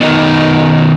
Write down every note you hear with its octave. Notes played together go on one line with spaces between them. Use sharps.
B2 D#3 D#4